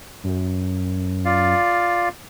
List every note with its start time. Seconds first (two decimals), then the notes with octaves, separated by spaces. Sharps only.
0.24 F#2
1.25 F4 D5 F5